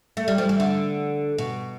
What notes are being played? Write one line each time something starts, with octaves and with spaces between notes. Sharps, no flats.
A3
G3
F3
E3
D3
B2